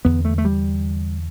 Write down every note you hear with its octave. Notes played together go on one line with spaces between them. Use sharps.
E2 D3 B3
A3
A3
G3